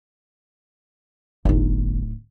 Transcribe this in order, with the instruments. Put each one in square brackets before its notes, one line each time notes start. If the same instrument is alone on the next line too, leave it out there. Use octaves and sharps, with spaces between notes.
[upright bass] D1 D#4 [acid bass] G1